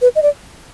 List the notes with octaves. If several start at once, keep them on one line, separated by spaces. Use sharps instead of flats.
B4
D#5
D5